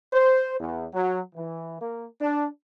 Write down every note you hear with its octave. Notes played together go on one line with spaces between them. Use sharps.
C5
E2
F#3
E3
A#3
D4